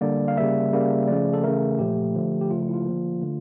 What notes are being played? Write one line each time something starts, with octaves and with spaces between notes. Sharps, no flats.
D3 G3 A#3 D5
F5
C#3 G3 A#3 E5
C#3 G3 A#3
C#3 F3 A3 D5
A4
C#3 E3 A3 A#4
A#2 F3 A3 G4
D3 F3 A3
G4
C#3 F3 A3 F4
F4
E4
F4
D3 F3 A#3
D3 A3